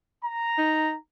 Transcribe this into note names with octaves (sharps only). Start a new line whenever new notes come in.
A#5
D#4